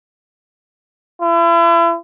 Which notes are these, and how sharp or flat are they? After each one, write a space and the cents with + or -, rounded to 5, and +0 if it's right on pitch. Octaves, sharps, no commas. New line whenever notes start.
E4 +40